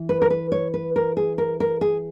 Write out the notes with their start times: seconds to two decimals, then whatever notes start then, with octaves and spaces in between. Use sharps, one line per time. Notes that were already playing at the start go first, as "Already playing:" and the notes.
Already playing: E3
0.09 B4
0.22 A#4
0.30 B4
0.52 C#5
0.74 B4
0.96 A#4
1.17 G#4
1.38 A#4
1.60 A#4
1.81 G#4